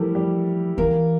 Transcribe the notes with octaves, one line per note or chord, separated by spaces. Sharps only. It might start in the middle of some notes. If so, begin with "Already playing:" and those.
Already playing: E3 F3 G3 A3 E4 G4 A4 A#4
G3 G4
E3 A#3 A#4